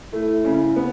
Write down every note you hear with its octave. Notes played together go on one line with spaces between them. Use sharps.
A3 E4
C#3
B3